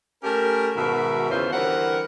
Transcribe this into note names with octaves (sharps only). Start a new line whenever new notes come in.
A3 C#4 G4 A#4
G#2 B2 D#3 F#4 A#4 E5
E2 C#3 E3 C#4 F4 C5
D3 E3 G3 C4 A#4 F#5